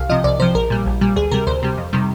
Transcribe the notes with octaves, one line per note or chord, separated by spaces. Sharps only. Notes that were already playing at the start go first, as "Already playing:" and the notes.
Already playing: C2 F5
C3 F3 D#5
C2 D5
C3 F3 C5
A#1 A#4
A#2 G3
A#1
A#2 G3
D2 G#4
C3 G3 A#4
D2 C5
C3 G3
F2
C3 D#3 G3